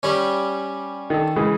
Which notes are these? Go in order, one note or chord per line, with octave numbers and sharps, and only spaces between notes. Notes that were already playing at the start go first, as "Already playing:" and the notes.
G3 C#4
D#3 A4
C#3 E3 G#3